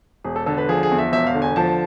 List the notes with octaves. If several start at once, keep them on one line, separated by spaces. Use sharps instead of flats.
E1 G#4
A4
D3 A4
B4
F3 G#4
G#4
E2
E5
E1 E5
F5
D3
G#5
F3 A5